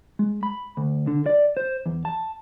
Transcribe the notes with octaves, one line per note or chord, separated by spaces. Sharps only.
G#3
B5
D2
D3
D5
C5
E2
A5